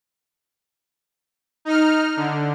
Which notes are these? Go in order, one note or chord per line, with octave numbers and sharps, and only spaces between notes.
D#4 F6
D3